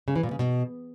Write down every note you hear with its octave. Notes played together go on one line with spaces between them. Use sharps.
C#3
E3
A#2
C#3
B2